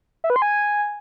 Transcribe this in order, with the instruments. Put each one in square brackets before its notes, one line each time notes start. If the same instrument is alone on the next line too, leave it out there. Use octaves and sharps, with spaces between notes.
[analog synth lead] E5
B4
C6
G#5